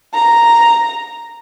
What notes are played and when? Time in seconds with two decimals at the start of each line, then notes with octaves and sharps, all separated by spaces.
0.14 A#5